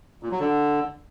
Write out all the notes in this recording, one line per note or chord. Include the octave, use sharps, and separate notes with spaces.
A#2
F#3
D3